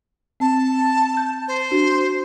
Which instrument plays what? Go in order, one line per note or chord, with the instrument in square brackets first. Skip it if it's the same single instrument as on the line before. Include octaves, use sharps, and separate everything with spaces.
[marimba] C4 [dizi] A5
[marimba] G6
[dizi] C5
[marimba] D4 F#4